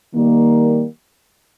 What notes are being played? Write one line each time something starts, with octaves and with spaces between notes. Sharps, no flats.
D#3 G3 A#3